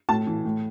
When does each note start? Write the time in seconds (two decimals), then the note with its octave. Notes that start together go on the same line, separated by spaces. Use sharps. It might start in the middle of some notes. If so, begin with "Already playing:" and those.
0.09 A2 A5
0.27 E3
0.45 A2